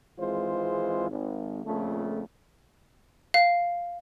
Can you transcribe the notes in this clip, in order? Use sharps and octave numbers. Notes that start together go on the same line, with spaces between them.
G#1 F2 E3 G#3 F4 C5
G#1
F2 A#2 C#3 A3
F5